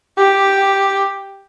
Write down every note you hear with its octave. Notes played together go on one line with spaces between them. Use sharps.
G4